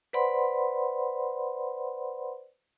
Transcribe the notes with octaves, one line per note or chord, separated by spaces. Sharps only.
B4 C5 D5 F#5 B5 C6